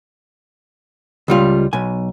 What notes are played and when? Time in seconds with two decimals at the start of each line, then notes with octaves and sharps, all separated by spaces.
1.28 C#2 G3 F4
1.73 B1 G#5